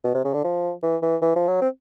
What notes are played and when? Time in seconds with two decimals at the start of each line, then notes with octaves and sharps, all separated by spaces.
0.04 B2
0.15 C3
0.24 C#3
0.34 D3
0.44 F3
0.83 E3
1.02 E3
1.22 E3
1.36 F3
1.48 F#3
1.61 C4